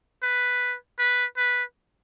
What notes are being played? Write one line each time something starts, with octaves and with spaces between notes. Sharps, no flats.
B4
B4
B4